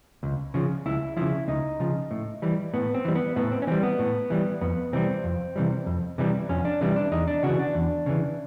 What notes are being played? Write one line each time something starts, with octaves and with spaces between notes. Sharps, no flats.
C#2
C#3 F3
C#2 E4
C#3 F3 E4
C#2 D#4
C#3 F3
A2
E3 G3
A2 B3
C4
E3 G3
B3
A2 B3
C4
C#4
E3 G3 C4
B3
A2
E3 G3
F2 B3
C3 E3 G3 C4
F2
C3 E3 G3
F2
C3 E3 G3
F2 C#4
D4
C3 E3 G3
D4
E2 D#4
D4
C#3 E3 F#4
D4
E2
C#3 E3